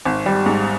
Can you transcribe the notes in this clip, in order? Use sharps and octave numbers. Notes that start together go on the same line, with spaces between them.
G#1
G3
G#2